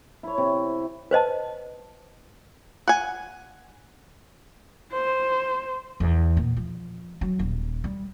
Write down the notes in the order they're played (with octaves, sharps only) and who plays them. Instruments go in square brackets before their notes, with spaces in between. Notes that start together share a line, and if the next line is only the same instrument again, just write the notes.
[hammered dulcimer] E4 C#5
C3
[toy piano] B4 C5 D#5 A5
[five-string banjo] F#5 G#5
[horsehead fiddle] C5
[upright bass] E2
A#2
F3
F#3
D#1
G3